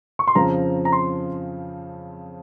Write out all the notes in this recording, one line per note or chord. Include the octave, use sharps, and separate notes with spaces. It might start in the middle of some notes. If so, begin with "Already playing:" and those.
C#6
C6
F2 C#3 F3 C4 A#5
A#5
C6